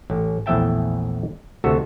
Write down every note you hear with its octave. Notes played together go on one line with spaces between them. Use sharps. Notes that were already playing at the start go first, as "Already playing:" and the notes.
A1
A#1 E2 A2 E5 G5 A5
D2 C3 F#4 A4